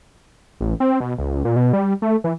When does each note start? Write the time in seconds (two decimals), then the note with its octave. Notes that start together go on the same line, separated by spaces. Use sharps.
0.60 A1
0.80 C4
1.01 B2
1.18 C#2
1.45 A#2
1.56 B2
1.73 G3
2.02 A3
2.24 E3